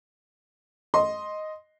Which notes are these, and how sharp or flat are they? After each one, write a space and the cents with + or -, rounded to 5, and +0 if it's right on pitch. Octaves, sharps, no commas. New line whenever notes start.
D#5 +0 C6 +0